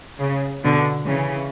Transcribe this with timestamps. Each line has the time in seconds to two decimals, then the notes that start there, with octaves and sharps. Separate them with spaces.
0.20 C#3
0.64 B2 D3
1.07 C#3 E3